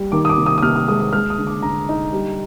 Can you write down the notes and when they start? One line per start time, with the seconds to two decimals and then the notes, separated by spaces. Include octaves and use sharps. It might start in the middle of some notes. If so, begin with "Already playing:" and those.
Already playing: G3
0.12 D#3 D6
0.25 D#6
0.29 D6
0.38 C3
0.46 D#6
0.58 D#6
0.62 C3 F6
0.76 D#6
0.88 G#3 D#6
1.00 D#6
1.13 G#3 F6
1.30 D#6
1.38 D3
1.47 D6
1.63 D3 A#5
1.89 D#4
2.13 G3